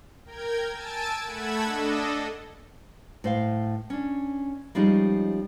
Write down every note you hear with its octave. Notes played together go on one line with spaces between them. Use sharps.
A#4 G5 G#6
G#5 A5 E6 A6 D7
A3 A4 F#5 B5 G#6 E7
D4 A4 D#5
A2 C5 F5
C#4 D4
F3 G3 G#3 C#4 D#4